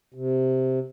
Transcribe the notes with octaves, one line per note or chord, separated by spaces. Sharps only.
C3